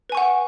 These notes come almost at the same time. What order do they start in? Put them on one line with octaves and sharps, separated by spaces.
B4 G#5 C#6 F#5